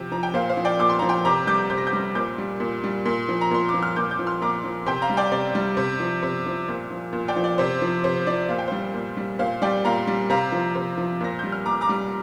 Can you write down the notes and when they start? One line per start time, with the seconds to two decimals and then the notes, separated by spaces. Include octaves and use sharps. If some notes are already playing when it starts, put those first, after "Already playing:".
Already playing: C3 F3 G5
0.12 F3 A#5
0.23 G5
0.34 A#2 C5 F5
0.49 C5 F5
0.57 F3
0.65 D5 G5
0.79 A#2 D6
0.89 C6
0.99 F3 A#5
1.09 G5 C6
1.25 C3 A#5 D6
1.47 G3 D6 G6
1.70 C3 G6
1.78 A#6
1.87 D6 G6
1.93 G3
2.15 A#2 D6 G6
2.38 G3
2.60 A#2
2.84 G3
3.05 A#2
3.29 F3
3.41 A#5
3.51 A#2 C6
3.69 D6
3.74 F3
3.82 F6
3.96 A#2 D6 G6
4.11 D6 G6
4.19 F3
4.27 C6 F6
4.42 A#2 A#5 D6
4.64 F3
4.86 C3 G5 C6
5.02 F5 A#5
5.10 G3
5.17 D5 G5
5.32 C3 D5
5.55 G3
5.77 C3
6.00 F3
6.23 C3
6.46 F3
6.68 A#2
6.91 F3
7.13 A#2
7.28 D5 G5
7.36 F3
7.44 D5
7.58 C3 C5
7.82 F3
8.04 C3 C5
8.27 F3 D5
8.48 A#2 F5
8.59 G5
8.68 G3 C5 F5
8.94 A#2
9.17 G3
9.39 A#2 C5 F5
9.62 G3 D5 G5
9.85 A#2 F5 A#5
10.07 G3
10.30 C3 F5 A#5
10.52 F3
10.75 C3
10.97 F3
11.21 A#2 A#6
11.39 G3 G6
11.52 F6
11.66 A#2 A#5 D6
11.81 A#5 D6
11.89 G3